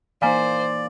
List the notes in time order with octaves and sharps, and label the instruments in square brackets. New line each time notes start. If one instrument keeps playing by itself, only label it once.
[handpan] E3 A#3 D#4 [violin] C5 [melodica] D5 [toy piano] F5 G#5 A#5